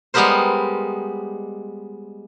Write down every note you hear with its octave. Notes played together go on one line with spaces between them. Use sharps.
G3 G#3 B3 G4 A#4 C5